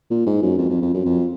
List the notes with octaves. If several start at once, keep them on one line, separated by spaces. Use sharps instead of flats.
A#2
G#2
F#2
F2
F2
F2
F#2
F2